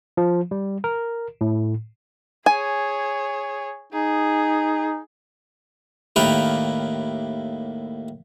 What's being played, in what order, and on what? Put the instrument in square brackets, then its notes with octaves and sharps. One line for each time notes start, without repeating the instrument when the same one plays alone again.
[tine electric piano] F3
G3
A#4
A2
[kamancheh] G#4 C#5 [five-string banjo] G#5
[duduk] D#4 [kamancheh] G#4
[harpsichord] D#2 A2 A#3 B4 F5 G5